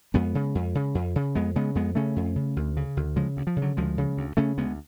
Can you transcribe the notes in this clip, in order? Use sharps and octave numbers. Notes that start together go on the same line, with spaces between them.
F2 G#3 B3
C#3
F2
C#3
F2
C#3
F2 G#3 B3
C#3 G#3 B3
F2 G#3 B3
C#3 A3 C#4
F2
C#3
D2
C#3
D2
C#3 F3 G#3
D2
F3
C#3
D3 F#3
D2 F3 G#3
C#3
D2
C#3 A3 C#4
D2 G#3 B3